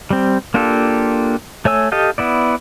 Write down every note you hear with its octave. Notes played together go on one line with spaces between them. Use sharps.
G3 C4
A#3 D4 F4 G4 A4
A3 C#5 G#5 E6
G4 A4 D#5 F5 G5
B3 E4 D5